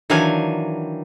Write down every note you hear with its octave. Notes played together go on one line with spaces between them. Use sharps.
D#3 E3 F#3 D4 F5 G#5